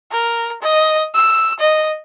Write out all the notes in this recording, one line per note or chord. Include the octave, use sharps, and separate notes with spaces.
A#4
D#5
E6
D#5